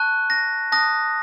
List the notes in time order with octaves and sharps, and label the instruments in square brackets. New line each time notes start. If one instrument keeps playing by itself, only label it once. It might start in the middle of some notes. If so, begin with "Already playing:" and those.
Already playing: [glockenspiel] A5 C#6 F#6
A#6
A5 D#6 F#6 A#6